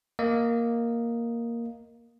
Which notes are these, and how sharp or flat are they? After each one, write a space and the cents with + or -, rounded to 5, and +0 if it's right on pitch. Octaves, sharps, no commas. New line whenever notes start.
A#3 +0 D#5 +0